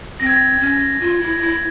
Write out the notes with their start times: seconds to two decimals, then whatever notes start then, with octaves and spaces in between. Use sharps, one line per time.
0.20 C4 A#6
0.27 G#6
0.34 A#6
0.61 C#4
1.00 F4
1.21 E4
1.40 E4